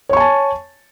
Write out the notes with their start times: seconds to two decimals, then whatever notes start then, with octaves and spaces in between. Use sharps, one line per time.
0.09 C#5
0.13 C#6
0.17 G#5
0.20 A5